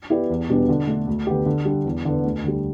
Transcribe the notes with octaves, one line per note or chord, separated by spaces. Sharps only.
B3 E4 G4 D5
E2
B2 G3 B3 D4
D3
A3 D4 A4
D2
D3 B3 G4
D3
G3 D4
E2
D3 B3
D2
D3 G3